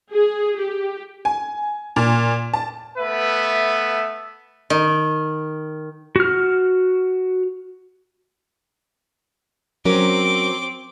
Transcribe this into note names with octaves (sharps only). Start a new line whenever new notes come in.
G#4
G4
G#5
A#2
A5
A3 B3 B4 E5
D#3
F#4 F6
F#3 C4 C#4 A#4 D6